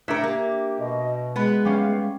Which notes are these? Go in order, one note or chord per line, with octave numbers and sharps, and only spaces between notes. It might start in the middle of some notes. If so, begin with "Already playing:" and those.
A2 D4 A#4 E5
A#3 G4
B2 D#5
G#3 B3 B4
E3 G3 A3 C#4 F5